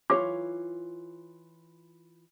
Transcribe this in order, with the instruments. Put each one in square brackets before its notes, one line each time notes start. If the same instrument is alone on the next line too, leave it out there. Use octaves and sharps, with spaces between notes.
[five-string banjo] E3 F4 C#5 [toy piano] D6